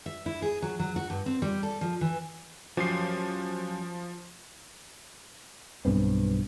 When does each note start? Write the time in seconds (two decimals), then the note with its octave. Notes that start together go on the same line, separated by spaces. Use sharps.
0.06 E5
0.26 E4
0.42 G#4
0.62 F#3
0.79 F#3
0.96 F#4
1.10 G2
1.26 C4
1.42 G3
1.63 A4
1.81 F3
2.01 E3
2.77 F3 F#3 C#4 G4 C7
5.85 B1 G2 B3 C4